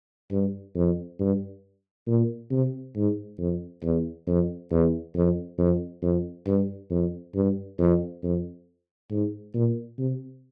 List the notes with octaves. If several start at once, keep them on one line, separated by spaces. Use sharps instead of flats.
G2
F2
G2
A#2
C3
G#2
F2
E2
F2
E2
F2
F2
F2
G2
F2
G2
F2
F2
G#2
A#2
C3